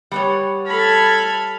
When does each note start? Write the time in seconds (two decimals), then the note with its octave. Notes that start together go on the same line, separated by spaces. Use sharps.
0.12 G3 B3 C#5
0.67 A4 A5 B5 F6 G#6